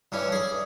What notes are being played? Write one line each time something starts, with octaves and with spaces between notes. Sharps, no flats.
G2 E3 C#4
G#4